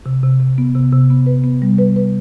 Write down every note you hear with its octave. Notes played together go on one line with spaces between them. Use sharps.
C3
C3
C3
B3
C3
C3
B3
B4
B3
G3
B4
B4